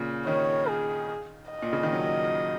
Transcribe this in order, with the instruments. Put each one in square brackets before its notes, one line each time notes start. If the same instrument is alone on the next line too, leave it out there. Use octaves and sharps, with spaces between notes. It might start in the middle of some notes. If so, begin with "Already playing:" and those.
Already playing: [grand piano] A#2 C#3
[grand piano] D#3 [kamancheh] C#5
[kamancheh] G#4
D#5
[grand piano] A#2
C#3
D#3
F#3